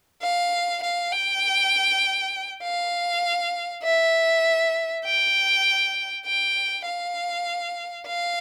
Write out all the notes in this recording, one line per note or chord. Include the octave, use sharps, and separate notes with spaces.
F5
F5
G5
F5
E5
G5
G5
F5
F5